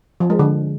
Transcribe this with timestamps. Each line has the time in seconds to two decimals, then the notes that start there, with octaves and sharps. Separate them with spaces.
0.20 F3
0.30 G#3
0.39 D3